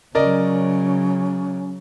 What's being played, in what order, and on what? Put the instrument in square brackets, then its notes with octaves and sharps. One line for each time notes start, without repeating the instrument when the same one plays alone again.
[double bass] C#3 F#3 [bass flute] C#4 [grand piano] A#4 D5 D#5